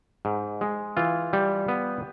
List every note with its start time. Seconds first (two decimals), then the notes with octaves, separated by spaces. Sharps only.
0.25 G#2
0.61 G#3
0.97 E3 F4
1.33 G3
1.68 B3